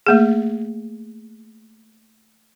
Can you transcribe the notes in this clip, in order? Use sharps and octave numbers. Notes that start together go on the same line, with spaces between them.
A3 A#3 G#4